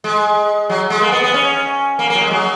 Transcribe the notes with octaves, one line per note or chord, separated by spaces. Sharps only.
G#3
F#3
G#3
A#3
B3
B3
C#4
A#3
F#3 A#3
G#3
F#3